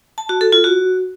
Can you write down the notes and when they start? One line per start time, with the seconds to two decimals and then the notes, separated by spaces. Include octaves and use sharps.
0.18 A5
0.29 F#4
0.41 A4
0.52 F4
0.64 F#4